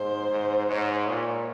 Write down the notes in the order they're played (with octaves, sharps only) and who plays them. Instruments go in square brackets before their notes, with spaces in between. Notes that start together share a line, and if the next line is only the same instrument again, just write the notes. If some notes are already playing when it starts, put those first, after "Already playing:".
Already playing: [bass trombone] G#2 [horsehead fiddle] C5
[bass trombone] G#2
[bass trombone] G#2 [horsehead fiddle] C#5
[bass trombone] A#2